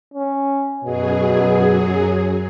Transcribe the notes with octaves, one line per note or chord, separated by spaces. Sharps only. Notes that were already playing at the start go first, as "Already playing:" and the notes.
C#4
F#2 B2 F#3 G#4